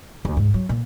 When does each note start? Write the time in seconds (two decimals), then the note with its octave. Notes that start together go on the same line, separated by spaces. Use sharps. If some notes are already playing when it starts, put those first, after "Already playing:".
0.25 D2
0.37 G#2
0.54 F#3
0.69 A#2